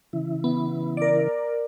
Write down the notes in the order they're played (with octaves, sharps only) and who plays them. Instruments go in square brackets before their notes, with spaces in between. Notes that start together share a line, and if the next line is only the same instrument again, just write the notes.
[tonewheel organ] C#3 E3 E4
[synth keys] B3
A#4 D5